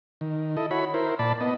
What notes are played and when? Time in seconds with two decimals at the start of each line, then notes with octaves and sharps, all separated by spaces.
0.21 D#3
0.57 E4 A4 D#5
0.71 E4 F#4 C#5 B5
0.94 E4 A#4 C5
1.19 A#2 D5 A5 B5
1.41 B3 D#5